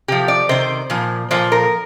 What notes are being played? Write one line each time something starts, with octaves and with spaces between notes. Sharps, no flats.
C3 F3 G4
D5
C3 D#3 C5
A#2 F3
A#2 F3 C5
A#4